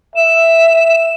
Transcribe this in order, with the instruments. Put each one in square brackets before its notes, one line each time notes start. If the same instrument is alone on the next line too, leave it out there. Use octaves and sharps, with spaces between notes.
[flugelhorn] E5 [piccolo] E7